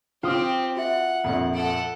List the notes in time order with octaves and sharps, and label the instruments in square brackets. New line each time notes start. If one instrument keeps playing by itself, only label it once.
[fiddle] C4 G4 [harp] F4 D#6
[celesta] F#4 E5 [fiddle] F#5
[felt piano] A#1 F2
[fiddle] A4 F#5 [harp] D7